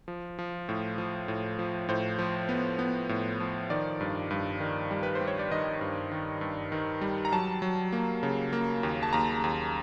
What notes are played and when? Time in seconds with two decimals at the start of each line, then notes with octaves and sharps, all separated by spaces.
0.08 F3
0.39 F3
0.69 A2
0.98 F3
1.28 A2
1.59 F3
1.89 A2 C5
2.19 F3
2.49 B3
2.79 B3
3.09 A2
3.40 F3
3.70 D#3 D5
4.01 G2
4.31 G2
4.60 D#3
4.91 G3
5.03 B4
5.15 C5
5.21 G3
5.27 C#5
5.39 D5
5.51 D#3 D#5
5.81 G2
6.12 D#3
6.41 G2
6.72 D#3
7.01 G3
7.25 A#5
7.32 F#3 A5
7.62 F#3
7.93 A#3
8.23 C#3
8.53 A#3
8.83 D#2
9.03 A5
9.13 D#2 A#5
9.44 D#2